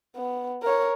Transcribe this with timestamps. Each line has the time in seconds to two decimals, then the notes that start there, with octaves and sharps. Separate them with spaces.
0.16 B3
0.62 A#4 C#5